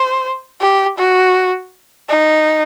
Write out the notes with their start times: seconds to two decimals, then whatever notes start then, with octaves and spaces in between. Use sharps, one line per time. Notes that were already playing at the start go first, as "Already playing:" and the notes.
Already playing: C5
0.60 G4
0.97 F#4
2.09 D#4